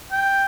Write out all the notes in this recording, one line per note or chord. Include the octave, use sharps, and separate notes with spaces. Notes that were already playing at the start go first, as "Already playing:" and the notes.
G5